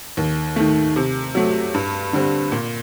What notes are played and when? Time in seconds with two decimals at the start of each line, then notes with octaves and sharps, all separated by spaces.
0.17 D#2
0.56 D#3 A3
0.96 C3
1.35 F#3 A3
1.74 G2
2.13 D3 G3 C4
2.52 A#2